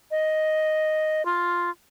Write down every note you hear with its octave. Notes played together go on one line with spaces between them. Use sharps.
D#5
F4